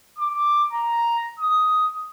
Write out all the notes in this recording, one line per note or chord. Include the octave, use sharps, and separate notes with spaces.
D6
A#5
D#6